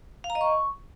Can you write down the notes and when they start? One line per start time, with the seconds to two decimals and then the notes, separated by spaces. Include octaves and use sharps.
0.24 F5
0.30 A#5
0.35 D#5
0.41 C#6